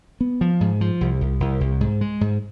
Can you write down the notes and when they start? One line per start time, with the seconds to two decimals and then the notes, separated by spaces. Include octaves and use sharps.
0.21 B3
0.41 F3
0.61 G#2
0.81 F3
1.01 C2
1.21 C2
1.40 C2
1.61 C2
1.81 G#2
2.01 G#3
2.21 G#2